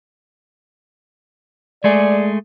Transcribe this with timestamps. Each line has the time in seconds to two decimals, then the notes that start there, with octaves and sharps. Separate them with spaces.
1.84 G#3 A3 G#4 D5